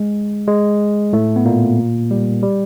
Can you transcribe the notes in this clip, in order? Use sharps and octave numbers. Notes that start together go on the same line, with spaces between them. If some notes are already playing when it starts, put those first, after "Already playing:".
Already playing: G#3
G#3
A2 A3
B3
A#2 A#3
G3
G3